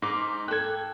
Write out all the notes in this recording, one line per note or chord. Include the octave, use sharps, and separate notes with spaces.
G#2 D#4 D6
A4 G5 F#6 G#6